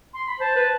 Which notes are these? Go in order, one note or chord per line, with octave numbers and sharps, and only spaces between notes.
C6
B5
C5 A5
B4